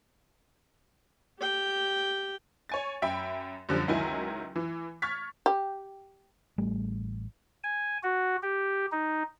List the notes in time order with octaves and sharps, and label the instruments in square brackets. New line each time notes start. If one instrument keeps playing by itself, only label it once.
[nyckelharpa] G4 G5
[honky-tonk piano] C#5 G#5 A6
F#2 E5 G5 B5
F#2 D3 F3 G3
C#2 D#3 F#3 E4 G#5
E3
C#6 F6 G#6 A6 B6
[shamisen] G4
[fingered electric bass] A1 G3 A3
[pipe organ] G#5
F#4
G4
D#4